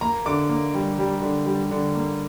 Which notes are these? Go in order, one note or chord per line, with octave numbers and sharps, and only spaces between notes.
A#3 A#5
D3 D6
A#3
G3
G3
D3
G3
D3
A#3